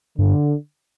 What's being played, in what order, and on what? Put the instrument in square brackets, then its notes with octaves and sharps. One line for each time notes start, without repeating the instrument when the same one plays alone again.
[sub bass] G2 [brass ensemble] D3